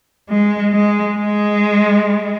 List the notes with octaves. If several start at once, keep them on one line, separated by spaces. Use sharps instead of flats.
G#3
G#3
G#3